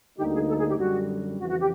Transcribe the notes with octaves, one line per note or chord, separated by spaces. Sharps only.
D2 D3 G3 A#3 D#4 G4
G#4
A4
G#4
G4
F#2 D3 G3 F#4
F2 C#3 E3 F#4
F#4
G4